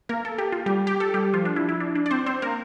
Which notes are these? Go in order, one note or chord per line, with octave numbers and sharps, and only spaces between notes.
A#3 A#4
A4
G4
F4
G3 G4
G4
A4
G3 G4
F3 F4
D4
E4
E4
D4
D4
D5
C4 C5
C4 C5
A#3 A#4